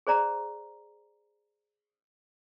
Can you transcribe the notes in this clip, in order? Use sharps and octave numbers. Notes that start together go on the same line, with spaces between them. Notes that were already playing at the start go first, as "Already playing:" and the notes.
G#4 C5 D5 A#5